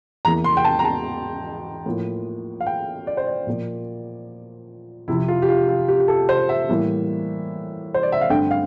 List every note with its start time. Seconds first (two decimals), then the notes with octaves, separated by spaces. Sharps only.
0.25 E2 E3 A#3 A#5
0.44 C6
0.57 G5
0.65 A5
0.79 A#5
0.85 A5
1.86 A2 F3 A#3
2.61 F5
2.67 G5
3.07 D5
3.17 C5
3.27 D5
3.47 A#2 F3 A#3
5.08 F2 C3 F3 E4
5.28 F4
5.42 G4
5.49 F4
5.69 F4
5.88 G4
6.00 G4
6.08 A4
6.29 C5
6.49 E5
6.69 A2 E3 G3 A#3
7.94 C5
8.03 D5
8.12 E5
8.21 F5
8.30 G2 D3 A3 C4 G5
8.51 F5